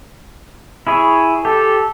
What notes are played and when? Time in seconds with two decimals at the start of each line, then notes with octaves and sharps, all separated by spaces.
0.87 E4 G#4 C#5
1.45 G4 A4